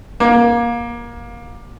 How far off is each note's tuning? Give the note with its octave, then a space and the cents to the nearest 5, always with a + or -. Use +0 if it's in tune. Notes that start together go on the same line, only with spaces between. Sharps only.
A#3 +25